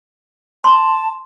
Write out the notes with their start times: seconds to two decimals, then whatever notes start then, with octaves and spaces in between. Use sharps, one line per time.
0.64 A5 C6